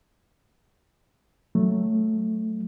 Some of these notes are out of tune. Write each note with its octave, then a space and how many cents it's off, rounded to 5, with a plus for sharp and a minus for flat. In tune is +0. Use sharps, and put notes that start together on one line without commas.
F#3 +0 A3 +0